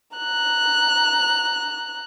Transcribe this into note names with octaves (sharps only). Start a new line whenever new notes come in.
A#5 F#6